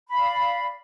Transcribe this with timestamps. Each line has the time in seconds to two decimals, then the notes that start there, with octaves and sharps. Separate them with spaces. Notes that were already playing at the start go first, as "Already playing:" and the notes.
0.09 B5
0.13 F5
0.17 D5